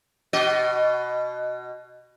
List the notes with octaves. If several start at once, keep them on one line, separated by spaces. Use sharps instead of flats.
B2 F#4 D#5